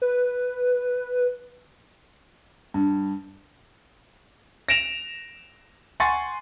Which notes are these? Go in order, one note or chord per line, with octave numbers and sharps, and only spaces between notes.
B4
G2
A#6 D7 E7 F7
F#5 G#5 C6 C#6 A6